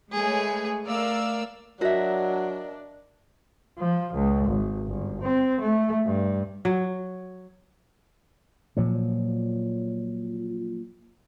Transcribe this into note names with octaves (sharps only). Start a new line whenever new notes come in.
G#3 A3 G#4 B4 C#5
A3 A#4 D5 F5 E6
F#3 D4 F#4 A#4 D#5 E5 A#6
F3
C#2
G#1
G1
C4
A3
G2
F#3
A#2 F3 F#3